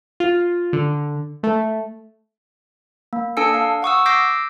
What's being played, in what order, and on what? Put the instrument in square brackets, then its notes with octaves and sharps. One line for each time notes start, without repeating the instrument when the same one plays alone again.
[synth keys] F4
D3
A3
[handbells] A#3
D4 A4 G#5 E6 C#7
F5
F#5 C#6 D#6 E6
D6 E6 G6 A#6 C7 D7